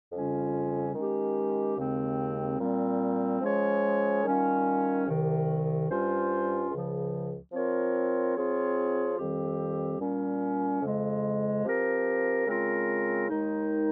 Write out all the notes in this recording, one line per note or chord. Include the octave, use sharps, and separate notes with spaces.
F2 C#3 G3 C#4 F4
D#3 G#3 C#4 G4
D#2 C#3 G#3 C4
A#2 G3 C4
F3 G#3 C#4 G#4 C#5
D#3 G3 C#4 F4
C2 C3 D#3
G2 G3 C#4 F4 C5
C#2 C#3 F3
F3 C4 F4 A#4 C#5
F3 C4 F4 G#4 C#5
F2 D#3 G3 C4 G4
A#2 G3 C#4
F2 C#3 G#3
F3 C4 G4 A#4
C#3 G#3 C4 F4 A#4
D#2 D#3 G#3 D#4